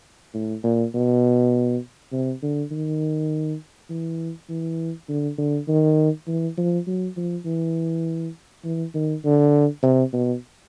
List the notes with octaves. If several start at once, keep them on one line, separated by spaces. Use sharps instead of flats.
A2
A#2
B2
C3
D3
D#3
E3
E3
D3
D3
D#3
E3
F3
F#3
F3
E3
E3
D#3
D3
C3
B2